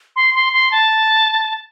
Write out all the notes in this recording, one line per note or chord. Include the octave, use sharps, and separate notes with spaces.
C6
C6
C6
A5